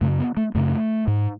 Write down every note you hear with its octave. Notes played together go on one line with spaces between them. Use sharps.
F#2 C#3 A3
B3
A3
F#2 C#3 A3
G#2